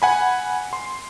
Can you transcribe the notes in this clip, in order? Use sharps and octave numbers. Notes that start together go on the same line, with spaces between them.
F#5 G#5 B5
C6